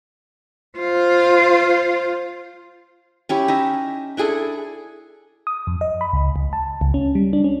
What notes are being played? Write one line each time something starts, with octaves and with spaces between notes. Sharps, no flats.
F4 C5
C#4 E4 G4
D#4 E5
D4 E4 G#4 A4
D#6
F2
D#5
B5
C#2
C#2
A5
C#2
C#4
G3
D4
C#4